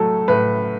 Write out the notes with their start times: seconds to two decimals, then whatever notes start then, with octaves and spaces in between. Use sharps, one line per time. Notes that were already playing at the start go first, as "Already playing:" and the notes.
Already playing: A2 F#3 A3 A4
0.28 A2 B4